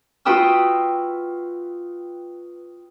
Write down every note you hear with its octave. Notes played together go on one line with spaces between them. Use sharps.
F4 F#4 B4 G5 D#6 E6